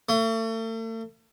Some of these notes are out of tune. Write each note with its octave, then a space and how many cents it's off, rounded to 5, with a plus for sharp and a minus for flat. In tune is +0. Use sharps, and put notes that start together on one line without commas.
A3 +40